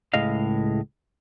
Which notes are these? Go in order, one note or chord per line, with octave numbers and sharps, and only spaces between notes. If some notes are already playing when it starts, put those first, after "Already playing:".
C#2 A2 G#3 D#5 F5